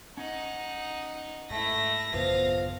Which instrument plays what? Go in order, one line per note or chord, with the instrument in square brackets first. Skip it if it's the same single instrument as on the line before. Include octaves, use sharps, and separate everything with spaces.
[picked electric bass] C#4 [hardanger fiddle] D#4 F#5
[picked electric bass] G#2 [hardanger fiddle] A3 E4 [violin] A#6
[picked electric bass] A1 F#2 C#3 [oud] F3 B3 [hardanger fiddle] F5